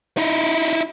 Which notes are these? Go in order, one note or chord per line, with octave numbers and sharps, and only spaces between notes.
D#4 E4